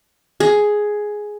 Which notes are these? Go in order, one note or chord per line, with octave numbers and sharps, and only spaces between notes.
G#4